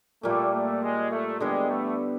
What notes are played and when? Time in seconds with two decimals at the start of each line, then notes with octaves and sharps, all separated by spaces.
0.23 A#2 G3 A3 A#3
0.52 A3
0.82 G#3
1.11 A3
1.40 D3 G3 G#3 B3 E4
1.69 A3